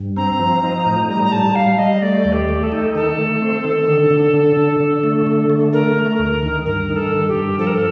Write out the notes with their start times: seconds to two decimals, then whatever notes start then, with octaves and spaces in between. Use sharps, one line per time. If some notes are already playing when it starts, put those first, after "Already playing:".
Already playing: G2
0.17 C4 A#5
0.39 F3
0.63 D#4
0.86 A2
1.09 G3 A#5
1.24 A#5
1.32 G3 A5
1.55 G3 F5
1.79 G3 D#5
2.02 A3 D5
2.25 D#2
2.33 G4
2.49 A3
2.63 A4
2.72 D#4
2.95 D#3 A4
3.18 A3
3.41 C4
3.64 D#3
3.87 D3
4.10 D3
4.34 D3
4.57 D3
4.80 D3
5.03 A3
5.27 D3
5.50 A3
5.73 A3 A#4
5.96 A3
6.19 D2
6.43 D#3
6.65 G2 A#4
6.89 D#3
6.96 A4
7.12 G2
7.28 G4
7.35 G2
7.59 F3 A4
7.67 A#4
7.75 A4